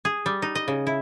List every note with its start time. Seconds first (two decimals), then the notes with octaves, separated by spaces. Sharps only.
0.05 G#4
0.26 G3
0.42 D#4
0.55 D#5
0.68 C#3
0.87 E4